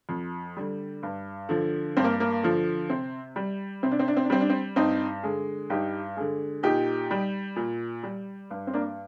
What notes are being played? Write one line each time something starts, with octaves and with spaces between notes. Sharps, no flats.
F2
D3 G3
G2
D3 F3
G2 C4
A#3
A#3
D3 F3
C3 C4
G3
C3 C4
D4
C4
D4
C4
D4
G3 C4
D4
C4
G2 C4 D#4
D3 G#3
G2 D#4 G4
D3 G#3
A#2 D#4 G4
G3
A#2
G3
G2
C4
A#3 D4